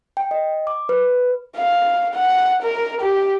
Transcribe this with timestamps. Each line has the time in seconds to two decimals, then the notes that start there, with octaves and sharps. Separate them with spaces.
0.17 G5
0.31 D#5
0.67 D6
0.89 B4
1.56 F5
2.15 F#5
2.63 A#4
3.01 G4